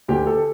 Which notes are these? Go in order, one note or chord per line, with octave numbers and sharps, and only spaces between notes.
D2 D3 G4
A4